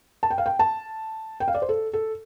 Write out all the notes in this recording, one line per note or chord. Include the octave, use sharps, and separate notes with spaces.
A5
G5
F5
G5
A5
G5
F5
D5
C5
A4
A4